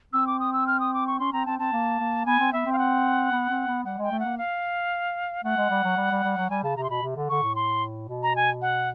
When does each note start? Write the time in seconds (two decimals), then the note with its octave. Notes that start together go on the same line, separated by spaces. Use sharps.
0.13 C4 E6
0.27 D6
0.40 D#6
0.53 E6
0.67 F6
0.80 D#6
0.94 D6
1.07 C#6
1.20 C#4 C6
1.33 C4 A#5
1.46 C4 A5
1.59 C4 A5
1.73 A#3
2.00 A#3
2.26 B3 G#5
2.40 C4
2.53 B3 E5
2.66 C4
2.73 F5
2.78 F#5
3.32 B3
3.50 C4
3.68 B3
3.85 G3 F#5
3.98 G#3 G5
4.11 A3
4.20 F#5
4.25 A#3
4.38 F5
5.44 A3 F#5
5.57 G#3
5.70 G3
5.84 F#3
5.97 G3
6.11 G3
6.23 G3
6.37 F#3
6.50 G3 G#5
6.63 C#3 A5
6.77 C3 A#5
6.84 C6
6.90 B2 B5
7.02 C3
7.16 D3
7.29 D3 C#6
7.43 A2
7.55 C6
8.09 B2
8.23 A#5
8.36 G#5
8.62 F#5